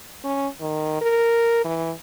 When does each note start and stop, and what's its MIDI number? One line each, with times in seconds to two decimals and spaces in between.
0.24 0.47 61
0.60 1.00 51
1.01 1.62 70
1.65 1.92 52